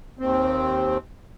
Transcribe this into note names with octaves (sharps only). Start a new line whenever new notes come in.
D#2 C4